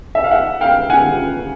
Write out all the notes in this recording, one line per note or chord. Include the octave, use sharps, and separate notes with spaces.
E5
F5
E5 F#5
F5 G5
F#5 G#5